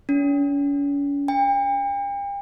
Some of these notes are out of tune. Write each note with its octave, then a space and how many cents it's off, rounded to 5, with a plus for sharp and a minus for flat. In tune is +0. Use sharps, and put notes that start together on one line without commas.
C#4 +40
G5 +40